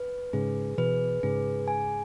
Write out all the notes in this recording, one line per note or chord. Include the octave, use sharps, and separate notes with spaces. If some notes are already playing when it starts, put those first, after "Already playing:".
Already playing: B4
G#2 C#3 G#4
B2 E3 B4
G#2 C#3 G#4
G#5